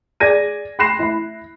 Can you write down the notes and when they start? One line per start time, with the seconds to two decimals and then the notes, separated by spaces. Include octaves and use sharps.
0.20 G#4 D5 G#6 A#6 D#7
0.79 B5 C6 F#6 A#6 C7 E7
0.99 E4 B5